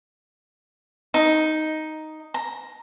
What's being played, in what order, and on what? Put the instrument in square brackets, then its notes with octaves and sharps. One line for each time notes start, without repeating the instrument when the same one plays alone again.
[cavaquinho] D#4
A#5